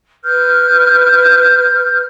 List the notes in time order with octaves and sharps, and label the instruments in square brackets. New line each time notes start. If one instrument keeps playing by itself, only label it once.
[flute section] B4 F6 G6